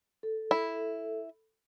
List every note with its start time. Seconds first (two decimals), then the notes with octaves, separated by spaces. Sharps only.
0.23 A4
0.51 E4